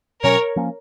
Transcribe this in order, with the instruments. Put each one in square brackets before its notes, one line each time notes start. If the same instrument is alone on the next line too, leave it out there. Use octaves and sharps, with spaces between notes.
[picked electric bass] B2 F#3 C#4 [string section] A#4 C#5
[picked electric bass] F3 A#3 C#4